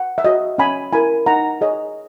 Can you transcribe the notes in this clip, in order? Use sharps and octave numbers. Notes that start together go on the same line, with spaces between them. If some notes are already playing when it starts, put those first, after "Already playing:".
Already playing: F#5
E5
F#4 C#5 D#5
C#4 G#5 B5
E4 A#4 G#5 B5
D#4 F#5 A#5
G#4 C#5 D#5